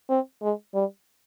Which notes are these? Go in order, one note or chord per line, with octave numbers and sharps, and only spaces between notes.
C4
G#3
G3